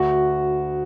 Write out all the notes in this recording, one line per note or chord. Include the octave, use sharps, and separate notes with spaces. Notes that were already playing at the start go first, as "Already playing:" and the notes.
Already playing: D2 F#4